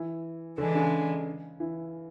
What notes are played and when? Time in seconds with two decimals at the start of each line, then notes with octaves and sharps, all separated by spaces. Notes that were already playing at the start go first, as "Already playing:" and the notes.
Already playing: E3
0.58 D3 E3 G#3 D4
0.75 C#3
1.60 E3